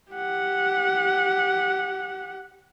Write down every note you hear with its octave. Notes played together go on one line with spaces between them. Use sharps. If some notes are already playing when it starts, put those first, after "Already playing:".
G4 F#5